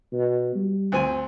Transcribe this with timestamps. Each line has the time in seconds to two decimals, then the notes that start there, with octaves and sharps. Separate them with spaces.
0.12 B2
0.55 G3
0.92 D2 C4 G#5